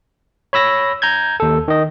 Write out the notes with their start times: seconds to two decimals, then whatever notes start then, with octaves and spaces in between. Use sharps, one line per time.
0.53 C#5 B5 E6 A#6
1.02 A#5 G6 G#6
1.40 D#2 A4
1.68 D#3 D#5